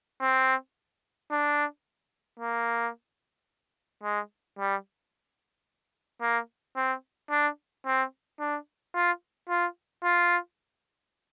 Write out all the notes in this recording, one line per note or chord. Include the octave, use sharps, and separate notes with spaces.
C4
D4
A#3
G#3
G3
A#3
C4
D4
C4
D4
F4
F4
F4